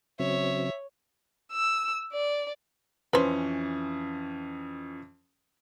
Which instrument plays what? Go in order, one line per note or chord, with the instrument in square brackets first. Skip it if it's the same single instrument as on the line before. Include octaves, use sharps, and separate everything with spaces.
[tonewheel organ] C#3 F#3 C4 [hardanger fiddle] C#5 [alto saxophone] E5
[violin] E6
D5
[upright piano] F2 E3 C#4 [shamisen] B4 C5